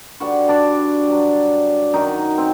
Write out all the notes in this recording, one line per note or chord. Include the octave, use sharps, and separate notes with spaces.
G2 D3 G3 F#4 F#5
D4 D5
G2 F#3
F#2 D#3 F#3 D#4
C4